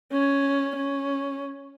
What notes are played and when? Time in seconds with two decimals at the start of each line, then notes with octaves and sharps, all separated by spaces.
0.12 C#4
0.76 C#4